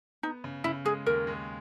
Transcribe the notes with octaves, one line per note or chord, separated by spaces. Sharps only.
B3 D#4
C#3
C#3 E4
G#3 G#4
D#2 A#4
G#3